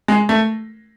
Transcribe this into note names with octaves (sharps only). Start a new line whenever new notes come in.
G#3
A3